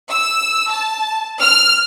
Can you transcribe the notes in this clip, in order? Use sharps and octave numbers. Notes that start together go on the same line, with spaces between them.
E6
A5
F6